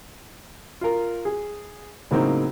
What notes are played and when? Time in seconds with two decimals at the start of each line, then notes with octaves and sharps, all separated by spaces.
0.81 F4 A#4
1.25 G#4
2.11 A2 C#3 F#3 A#3 C4 D#4